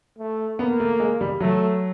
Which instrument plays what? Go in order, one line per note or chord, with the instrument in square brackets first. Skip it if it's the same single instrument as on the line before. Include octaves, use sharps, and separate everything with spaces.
[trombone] A3
[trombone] A#3 [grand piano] B3
[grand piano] A3
G#3
G3
[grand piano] F#3 [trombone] A3